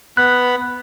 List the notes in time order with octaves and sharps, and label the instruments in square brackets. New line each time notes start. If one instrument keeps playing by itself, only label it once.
[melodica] B3 B5 [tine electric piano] F#6